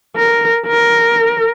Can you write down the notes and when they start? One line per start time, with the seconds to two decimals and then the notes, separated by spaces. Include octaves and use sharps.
0.16 A#4
0.67 A#4